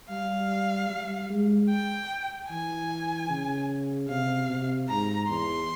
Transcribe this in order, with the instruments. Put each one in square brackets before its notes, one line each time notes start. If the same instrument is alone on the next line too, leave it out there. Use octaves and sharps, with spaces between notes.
[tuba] G3 [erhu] F5
[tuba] G3
G#3
[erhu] G5
[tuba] E3 [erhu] G#5
[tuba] C#3
[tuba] C3 [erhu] F5
[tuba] C3
[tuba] G#2 [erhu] A#5
[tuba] E2 [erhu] C6